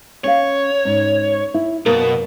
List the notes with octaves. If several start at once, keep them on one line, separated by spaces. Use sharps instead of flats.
C#4 C#5 F5
G#2 C#4
E4
F#2 B2 A#3 A#4